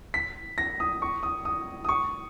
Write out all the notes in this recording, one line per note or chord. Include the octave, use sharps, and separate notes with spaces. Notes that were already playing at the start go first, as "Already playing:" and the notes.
B6
A#6
D#6
C#6
D#6
D#6
D#6
C#6